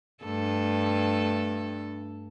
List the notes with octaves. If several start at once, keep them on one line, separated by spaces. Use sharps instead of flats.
G2 A3 A4